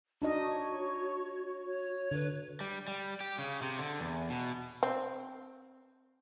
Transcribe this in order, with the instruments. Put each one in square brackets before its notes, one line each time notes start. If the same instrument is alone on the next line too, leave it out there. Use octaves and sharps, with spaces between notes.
[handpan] D4 D#4 D#5 [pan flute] F#4
[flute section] C#5 C#6
C#5
[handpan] D3 [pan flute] B4
[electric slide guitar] G3
G3
G4
C#3
C3
D3
E2
B2
[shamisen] C4